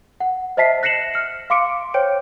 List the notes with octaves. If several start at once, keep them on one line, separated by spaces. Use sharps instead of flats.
F#5
C5 D#5 E5 A5 B6 C7
F#6 A#6 C7 C#7 E7 F#7
F6 C#7
F5 C6 D6 C#7 D7
C5 C#5 G5 D7